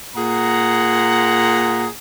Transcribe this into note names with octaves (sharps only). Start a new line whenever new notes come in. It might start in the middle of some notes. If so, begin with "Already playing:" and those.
A#2 G#4 F#5 A#5